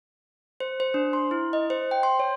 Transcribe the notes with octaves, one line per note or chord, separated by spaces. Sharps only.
C5
C5
D4
C6
E4
D#5
C5
G5
C6
C#5